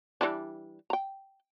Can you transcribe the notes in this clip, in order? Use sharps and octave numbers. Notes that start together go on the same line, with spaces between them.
E3 G3 D4
G5 A#5